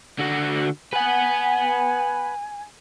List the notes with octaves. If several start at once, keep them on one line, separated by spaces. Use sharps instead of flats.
D3 F#4
B4 F#5 G#5